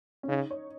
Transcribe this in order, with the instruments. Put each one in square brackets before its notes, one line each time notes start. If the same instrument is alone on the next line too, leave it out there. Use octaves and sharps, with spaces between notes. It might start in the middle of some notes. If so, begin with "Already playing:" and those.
[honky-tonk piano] C#4
[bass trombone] C#3 [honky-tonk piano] D#4
[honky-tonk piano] C#5